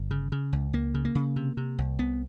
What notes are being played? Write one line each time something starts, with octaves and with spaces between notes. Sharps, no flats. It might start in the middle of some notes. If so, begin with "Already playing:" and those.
Already playing: G1
C#3
C#3
C#2
C#2 A#3
C#3
A#3
C#3
C3
C3
C2
C2 B3